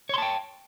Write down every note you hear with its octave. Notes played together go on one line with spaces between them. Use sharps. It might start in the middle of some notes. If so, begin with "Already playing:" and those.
C#5 G5 A5 C6